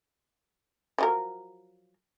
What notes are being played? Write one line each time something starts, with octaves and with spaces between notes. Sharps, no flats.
F3 F#3 A#4